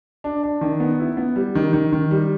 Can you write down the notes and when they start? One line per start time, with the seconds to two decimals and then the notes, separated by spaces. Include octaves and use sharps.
0.24 D4
0.43 D4
0.61 D#3
0.80 B3
0.99 E4
1.17 B3
1.36 G3
1.55 D#3
1.73 D#3
1.92 D#3
2.11 G3